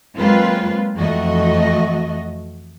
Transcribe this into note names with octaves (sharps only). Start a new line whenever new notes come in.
F#3 G#3 A#3 C4 F4 B4
F2 E3 A3 F#4 D#5